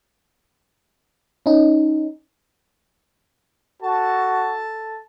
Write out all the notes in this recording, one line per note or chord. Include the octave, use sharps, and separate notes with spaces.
C#4 D#4
F#4 A4 A5